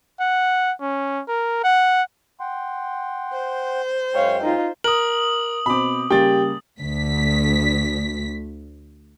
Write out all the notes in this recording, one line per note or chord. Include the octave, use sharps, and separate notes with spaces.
F#5
C#4
A#4
F#5
F#5 G5 C6
C5
F#2 G#3 C#5 F5 G5
D#4 F4
A#4 D#6 F#7
B2 C4 B5 D6
C#3 G3 A#3 G4 G5 A6
D2 B6